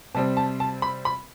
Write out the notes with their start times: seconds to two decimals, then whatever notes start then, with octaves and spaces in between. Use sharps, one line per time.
0.15 C3 G3 C4 A5
0.37 A5
0.60 A5
0.82 B5
1.05 B5